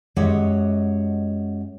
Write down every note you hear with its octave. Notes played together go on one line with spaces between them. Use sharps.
F#2 G#3 G4 C#5 D#5 F#5